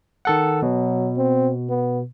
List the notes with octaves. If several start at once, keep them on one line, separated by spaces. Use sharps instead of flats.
D#3 A4 F#5
B2 F#3
C4
B3